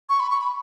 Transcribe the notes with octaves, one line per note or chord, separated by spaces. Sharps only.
C#6
B5
C#6
B5